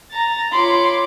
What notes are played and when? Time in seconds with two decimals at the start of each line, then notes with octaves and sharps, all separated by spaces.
0.11 A#5 A6
0.52 F4 C#5 B5 C6 D6